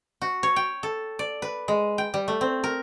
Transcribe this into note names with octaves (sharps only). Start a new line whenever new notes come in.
F#4
C#5
G5
A4
D5
B4
G#3
G5
G3
A3
C4
A#4